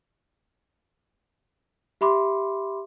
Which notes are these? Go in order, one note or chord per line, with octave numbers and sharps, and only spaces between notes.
G4 E5 B5 C6 D6